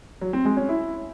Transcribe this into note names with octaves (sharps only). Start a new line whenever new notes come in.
F#3
C4
G#3
C#4
E4